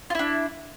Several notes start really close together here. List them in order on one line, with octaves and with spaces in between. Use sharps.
F4 E4 D4